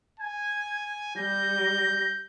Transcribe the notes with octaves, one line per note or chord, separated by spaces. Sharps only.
G#5 G#6
G3 G6 A#6